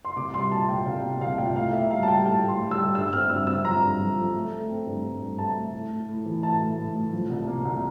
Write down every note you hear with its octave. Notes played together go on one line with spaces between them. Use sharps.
C6
C2 D6
G3 C6
A#2 A5
A#2 G5
C2 F5
A#3
C2 F5
A#2 G5
A2 F5
A#3 E5
G3 F5
A5
G3 G5
A2 A5
A2
C6
G3
E6
G3
G2 E6
C4 F6
G2 E6
C4 E6
F3 A#5
G2
F3
F3
A3
A3
C4
G2
G2
G2
A3 A5
A3
A2
A2
A2
E3
A2 A5
A2
A2
A2
F3
C2
A#3
C2